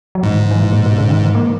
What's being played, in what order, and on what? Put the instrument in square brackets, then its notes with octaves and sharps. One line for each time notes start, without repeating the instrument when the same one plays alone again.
[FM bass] F#3
[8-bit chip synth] G#2 [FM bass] E3
[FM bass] D#3
C#3
E3
A#2
A#2
B2
C#3
D#3
E3
A#3